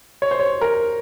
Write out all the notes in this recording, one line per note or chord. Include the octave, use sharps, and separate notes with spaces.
C#5
C5
C#5
A#4